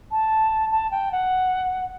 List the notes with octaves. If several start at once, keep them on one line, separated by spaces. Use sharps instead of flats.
A5
A5
G5
F#5